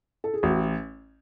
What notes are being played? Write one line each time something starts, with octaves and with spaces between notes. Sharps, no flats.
A4
G#4
A1 F#4